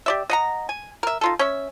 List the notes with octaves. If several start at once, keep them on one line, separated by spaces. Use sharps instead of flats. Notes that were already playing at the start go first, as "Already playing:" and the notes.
G4 D5 E5
D#5 F#5 A#5
G#5
A#4 E5
D#4 F4 A4
C#4 E5